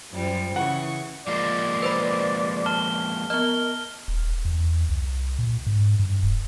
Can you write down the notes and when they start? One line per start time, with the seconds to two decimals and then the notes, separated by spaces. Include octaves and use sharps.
0.12 F#2 F3 G3
0.56 C#3 E3 F#5 C#6
1.27 F3 G#3 A#3 D5
1.82 B4 C5 B5
2.66 A5 F6 G7
3.30 B3 A#4 D#5 F6 G7
4.08 D#1
4.45 E2
4.89 C2
5.38 A#2
5.67 G#2
5.99 G2
6.23 D#1